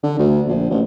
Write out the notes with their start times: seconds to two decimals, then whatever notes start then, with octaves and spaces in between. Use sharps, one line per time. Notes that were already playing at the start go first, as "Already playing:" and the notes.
0.03 D3
0.19 D2
0.48 A#1
0.70 A1